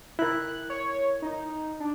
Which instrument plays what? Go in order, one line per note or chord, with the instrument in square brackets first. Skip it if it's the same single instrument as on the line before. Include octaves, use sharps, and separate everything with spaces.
[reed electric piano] E4 A#4 [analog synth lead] F#6
[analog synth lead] C#5
D#4
D4